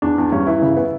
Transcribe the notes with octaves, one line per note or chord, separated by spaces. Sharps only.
E2 D4
E2
G2 C#4
E3 E4
C#3
B3